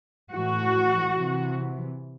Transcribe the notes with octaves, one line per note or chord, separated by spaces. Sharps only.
A2 E3 F#4
C3 E3